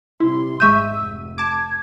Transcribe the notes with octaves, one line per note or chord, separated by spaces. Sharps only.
C3 G3 E4 C6
G#1 G#2 G#3 E5 C#6 E6 G6 D#7
F1
A5 D6 G#6